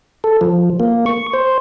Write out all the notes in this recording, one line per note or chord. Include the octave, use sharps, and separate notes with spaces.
A4
F3
A#3
C#6
C5